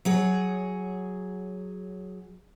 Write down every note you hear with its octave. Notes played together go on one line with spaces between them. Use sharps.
F#3 G#4 C#5